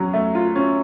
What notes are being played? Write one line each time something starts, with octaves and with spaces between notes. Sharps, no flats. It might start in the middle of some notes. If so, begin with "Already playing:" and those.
Already playing: F#3 C#4
A3
F4
C#4